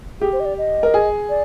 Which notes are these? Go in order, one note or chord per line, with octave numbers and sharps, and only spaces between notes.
G4 G#4
C5
D#5
D5
D#5
A#4
G#4
D5